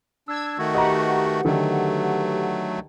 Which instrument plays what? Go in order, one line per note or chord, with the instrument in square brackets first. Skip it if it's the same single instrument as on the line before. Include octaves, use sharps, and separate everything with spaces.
[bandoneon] D4 [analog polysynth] E6 G#6
[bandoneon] D#3 A3 F#4
[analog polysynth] G4 B4 F#5 [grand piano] D#5 A#5
[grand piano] D3 D#3 [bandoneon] F#3 A3